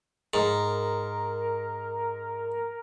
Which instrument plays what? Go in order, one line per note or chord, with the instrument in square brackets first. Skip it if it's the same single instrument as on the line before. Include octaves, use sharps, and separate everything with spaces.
[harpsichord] G#2 [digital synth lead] A#4